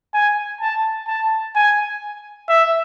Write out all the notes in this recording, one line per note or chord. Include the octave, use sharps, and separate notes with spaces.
G#5
A5
A5
G#5
E5